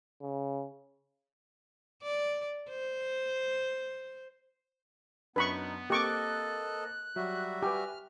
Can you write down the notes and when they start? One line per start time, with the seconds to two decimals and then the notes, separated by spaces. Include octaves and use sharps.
0.21 C#3
2.02 D5
2.70 C5
5.36 F#2 B3 D4 D#4 B4 B5 C#6
5.90 A#3 C4 G4 A4 D#5 C#6 D6 F#6
7.16 F#3 G3 F#4 E5
7.63 G4 B4 G#5 F6